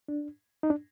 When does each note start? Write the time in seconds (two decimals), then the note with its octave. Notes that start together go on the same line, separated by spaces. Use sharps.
0.08 D4
0.63 D#4
0.70 D4